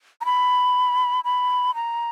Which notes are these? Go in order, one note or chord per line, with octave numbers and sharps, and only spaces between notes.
A#5
B5
B5
A#5